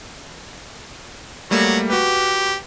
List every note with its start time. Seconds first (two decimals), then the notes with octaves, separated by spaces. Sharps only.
1.51 F#3 G3 A3 A#3 F#4
1.90 F#4 G4 B4